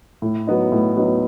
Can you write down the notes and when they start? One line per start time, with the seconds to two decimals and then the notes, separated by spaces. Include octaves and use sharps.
0.22 A2
0.47 F#3 B3 D#4
0.72 A2
0.96 F#3 B3 D#4